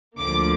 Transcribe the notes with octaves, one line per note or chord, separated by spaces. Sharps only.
D2 D3 F3 A#3 D6